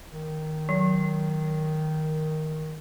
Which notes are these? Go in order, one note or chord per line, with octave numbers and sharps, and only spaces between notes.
D#3
F#3